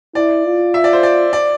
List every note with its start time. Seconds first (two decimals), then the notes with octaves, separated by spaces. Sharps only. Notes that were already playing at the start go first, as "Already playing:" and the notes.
0.15 E4 D5
0.46 F4
0.74 E5
0.84 D5
0.93 C5
1.03 D5
1.33 D5